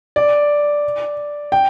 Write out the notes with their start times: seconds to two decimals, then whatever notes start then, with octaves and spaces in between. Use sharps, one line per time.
0.16 D5
1.52 G5